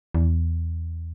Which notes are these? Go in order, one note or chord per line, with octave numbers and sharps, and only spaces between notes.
E2